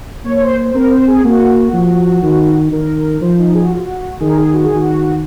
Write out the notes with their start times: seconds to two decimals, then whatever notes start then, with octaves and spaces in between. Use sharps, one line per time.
0.25 A#3 C#5
0.37 C#5
0.41 C5
0.65 C5
0.75 C4 A#4
0.90 C5
1.07 G#4
1.24 A#3 F#4
1.73 F3
2.22 D#3
2.71 D#3 A#4
3.21 F3 C5
3.38 D#4
3.55 G#4
3.63 F#4
3.70 F4
3.78 F#4
4.20 D#3 G#4
4.29 A#4
4.37 G#4
4.53 F#4
4.64 G#4
4.70 D#3
4.75 F#4